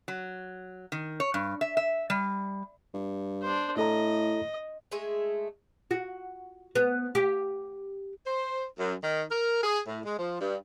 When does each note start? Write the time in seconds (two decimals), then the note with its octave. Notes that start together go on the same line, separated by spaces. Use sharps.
0.08 F#3
0.92 D#3
1.20 C#5
1.34 G2
1.61 E5
1.77 E5
2.10 G3
2.94 G2
3.42 D4 C5
3.77 A2 E4 A4 D#5 A#5
4.91 G#3 A3 G#4 E5
5.91 F#4
6.75 B3
7.15 G4
8.26 C5
8.79 F#2
9.03 D#3
9.31 A#4
9.63 G#4
9.87 A2
10.04 G#3
10.18 F3
10.40 G2